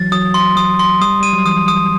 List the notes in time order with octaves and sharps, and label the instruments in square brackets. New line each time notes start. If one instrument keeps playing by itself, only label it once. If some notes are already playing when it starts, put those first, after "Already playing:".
Already playing: [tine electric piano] E3 F#3 [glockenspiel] A6
[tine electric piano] F#3 [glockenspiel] D#6
[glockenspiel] C6
[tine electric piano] F#3 [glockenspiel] D#6
[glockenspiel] C6
[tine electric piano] G3 [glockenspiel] D#6
[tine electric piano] G3 [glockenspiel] D#7
[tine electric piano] F#3
[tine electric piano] E3 [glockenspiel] D#6
[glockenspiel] D#6